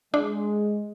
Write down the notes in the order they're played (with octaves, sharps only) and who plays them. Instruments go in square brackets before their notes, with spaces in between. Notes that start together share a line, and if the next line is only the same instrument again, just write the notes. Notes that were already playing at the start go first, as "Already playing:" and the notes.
[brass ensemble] G#3 [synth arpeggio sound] D4